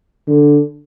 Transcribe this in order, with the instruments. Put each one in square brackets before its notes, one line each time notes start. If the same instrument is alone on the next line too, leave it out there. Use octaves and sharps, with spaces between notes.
[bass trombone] D3